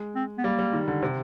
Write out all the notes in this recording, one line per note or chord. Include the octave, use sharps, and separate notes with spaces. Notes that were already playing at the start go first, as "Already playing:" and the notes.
Already playing: G#3
C4
B3
G3 A#3
G3
D#3
D3
C3